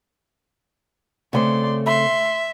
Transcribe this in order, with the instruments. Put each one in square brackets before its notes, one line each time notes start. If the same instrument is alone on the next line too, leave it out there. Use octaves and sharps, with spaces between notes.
[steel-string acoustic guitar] C#3 A3 C4 [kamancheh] D5 C6
[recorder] E5 [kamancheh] C6